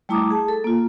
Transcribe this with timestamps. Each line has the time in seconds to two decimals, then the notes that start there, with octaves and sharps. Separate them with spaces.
0.09 G3 A3 E4 A#5 D6 D#6
0.30 G#4 A5
0.48 A4
0.64 A#3 F4